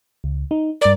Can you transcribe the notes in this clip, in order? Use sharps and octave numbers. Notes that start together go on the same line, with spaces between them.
C#2
D#4
G2 A#4 D5